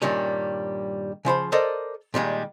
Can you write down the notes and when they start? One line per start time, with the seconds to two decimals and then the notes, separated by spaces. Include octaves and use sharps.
0.02 G2 A#2 D#3 G3 C#4
1.25 C#3 F3 C5 B5
1.52 A4 A#4 C5 D5 D#5
2.14 A#2 D#3 G3 G#3